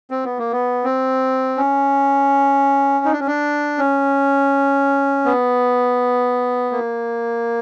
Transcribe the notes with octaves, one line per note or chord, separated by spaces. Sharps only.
C4
B3
A#3
B3
C4
C#4
D#4
D4
C#4
D4
C#4
B3
A#3